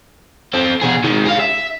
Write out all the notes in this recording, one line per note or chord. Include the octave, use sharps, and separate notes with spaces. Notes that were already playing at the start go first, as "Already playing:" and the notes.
C4 A4
B2 G#4
D#3 G#3
G#4 F5
E5